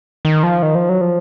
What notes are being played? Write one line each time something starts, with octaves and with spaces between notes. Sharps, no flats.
D#3
F3
D#3
F3
F#3
F3